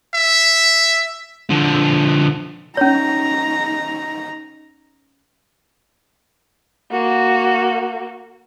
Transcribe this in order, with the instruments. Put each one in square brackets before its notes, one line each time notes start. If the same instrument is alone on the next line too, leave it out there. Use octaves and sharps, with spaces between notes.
[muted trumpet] E5
[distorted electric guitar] D3 F3
[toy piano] C#4 C#5 [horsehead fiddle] D#4 A#5
[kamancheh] A#3 F#4